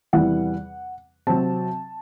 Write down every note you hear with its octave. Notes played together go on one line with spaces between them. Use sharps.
E2 C3 E3 G3 F#5
C3 F#3 C4 A5